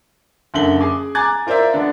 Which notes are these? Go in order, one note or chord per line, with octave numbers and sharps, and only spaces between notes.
F#1 D3 E5 F#7 G7
G#4 G#5 D6
G#5 A#5 D6 F#6 G#6 A6
F4 A#4 C5 D5 E5
D3 B3 D4